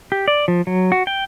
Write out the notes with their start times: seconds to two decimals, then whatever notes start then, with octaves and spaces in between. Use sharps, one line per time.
0.12 G4
0.28 D5
0.48 F3
0.67 F#3
0.92 F#4
1.07 G5